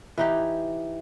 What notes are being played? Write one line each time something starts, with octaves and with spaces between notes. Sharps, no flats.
E3 D#4 G4